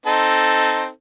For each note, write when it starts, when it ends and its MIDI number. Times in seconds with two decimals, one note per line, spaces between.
0.06 0.89 60
0.06 0.89 63
0.06 0.89 69